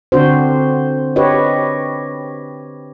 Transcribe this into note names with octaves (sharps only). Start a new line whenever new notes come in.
D3 C4 D4 F#4 C5
D4 G4 B4 C#5 D#5